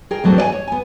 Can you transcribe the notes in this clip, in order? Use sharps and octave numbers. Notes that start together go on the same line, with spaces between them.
G#4 A#4 G5
E2 F#3 A3 C4
D5 G#5
C#5
B3 G#5